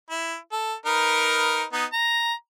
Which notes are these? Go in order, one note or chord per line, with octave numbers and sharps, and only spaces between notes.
E4
A4
D#4 A#4 B4
B3 D#4
A#5